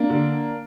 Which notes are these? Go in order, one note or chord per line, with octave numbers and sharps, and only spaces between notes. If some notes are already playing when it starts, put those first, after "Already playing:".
Already playing: A#3 D4
D3